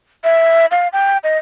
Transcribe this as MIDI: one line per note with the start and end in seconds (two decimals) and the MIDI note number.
0.24 0.66 76
0.71 0.88 77
0.93 1.18 79
1.24 1.38 75